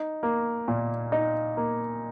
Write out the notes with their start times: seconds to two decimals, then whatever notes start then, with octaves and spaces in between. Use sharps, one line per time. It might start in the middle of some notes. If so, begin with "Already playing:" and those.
Already playing: D#4
0.23 A#3
0.68 A#2
1.12 D#4
1.57 A#3